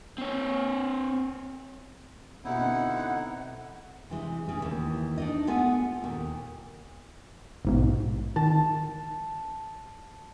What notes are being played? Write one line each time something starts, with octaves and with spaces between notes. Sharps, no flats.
C4 C#5
B2 D3 C4 D#4 E4 F#5
C3 E3 G#3
C#3 G#3
D#2 E3
D4 D#4 D#5
G#3 B3 F4 A4 F#5 G#5
D#2 A#2
A#1 G#2 B2
D#3 A5